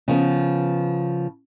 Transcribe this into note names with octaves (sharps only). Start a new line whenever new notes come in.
C#3 F3 B3